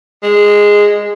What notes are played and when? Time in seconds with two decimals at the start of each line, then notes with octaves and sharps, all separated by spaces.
0.23 G#3